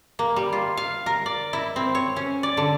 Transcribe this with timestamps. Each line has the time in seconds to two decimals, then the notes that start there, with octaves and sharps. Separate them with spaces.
0.19 A#3
0.36 G3
0.53 F4
0.77 F5
1.06 A#4
1.26 D5
1.53 E4
1.76 C4
1.95 C#5
2.16 C#4
2.43 D5
2.57 D3